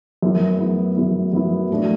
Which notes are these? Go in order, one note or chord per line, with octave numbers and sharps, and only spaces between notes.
F#2 F#3 B3 E4
F#2 F#3 B3 E4
F#2 F#3 B3 E4
F#2 F#3 B3 E4
A2 F#3 A3 D4 F#4